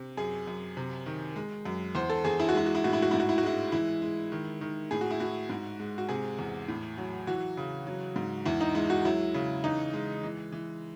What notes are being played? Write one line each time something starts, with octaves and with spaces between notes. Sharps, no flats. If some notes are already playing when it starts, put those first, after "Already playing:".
Already playing: C3
F#2 G#4
F#2
C3
D#3
G#3
F#2
E2 C5
A4
E2 G#4
E4
F#4
G#3 E4
F#4
E4
A2 F#4
E4
F#4
G#2 E4
F#4
E4
F#4
G#3 E4
E3 E4
G#3
D#3
D#3
A2 G#4
F#4
E4
A2 F#4
G#2
G#3
F#4
C3 G#4
E2
A2
F#3
E3 F#4
C#3
F#3
G#2
E2 E4
D#4
G#3 E4
F#4
F#3 E4
C#3
E3 D#4
G#3
E3
E3